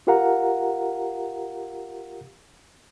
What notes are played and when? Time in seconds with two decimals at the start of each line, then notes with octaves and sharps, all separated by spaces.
0.07 F4 G4 A#4 F5 F#5 A#5